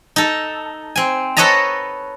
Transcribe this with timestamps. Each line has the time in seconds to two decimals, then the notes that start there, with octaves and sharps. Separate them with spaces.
0.16 D#4 A4
0.96 C4 G#5
1.37 A4 B4 C#5 D#5 A5 A#5